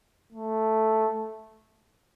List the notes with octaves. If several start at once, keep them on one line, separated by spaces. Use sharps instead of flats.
A3